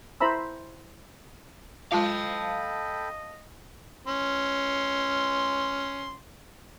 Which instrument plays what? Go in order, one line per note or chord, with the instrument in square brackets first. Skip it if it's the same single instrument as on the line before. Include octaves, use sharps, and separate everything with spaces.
[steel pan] E4 C5 E5 A#5 B5 E6
[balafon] G#3 F4 [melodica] A4 G5 B5 [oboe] D#5 [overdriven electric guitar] F5 A5
[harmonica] C#4 C6